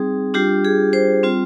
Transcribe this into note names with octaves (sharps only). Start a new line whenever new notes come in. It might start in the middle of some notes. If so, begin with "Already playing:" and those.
Already playing: G3 C4 D#4 G#4
G3 D4 F4 G4
G#4
C5
G3 C4 F4